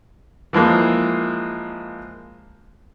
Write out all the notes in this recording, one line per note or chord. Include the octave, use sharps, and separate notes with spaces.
E3 F3 G#3 A#3